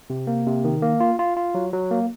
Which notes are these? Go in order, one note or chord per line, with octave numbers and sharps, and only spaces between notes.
C3
A#3
C3
D#3
A#3
F4
F4
F4
F#3
F#3
A#3